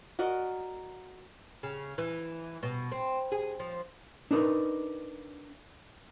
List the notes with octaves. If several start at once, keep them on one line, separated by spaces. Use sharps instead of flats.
F#4 A#4 D5 D#5
C#3
E3
B2
C4
G#4
F3
D4 D#4 A#4 B4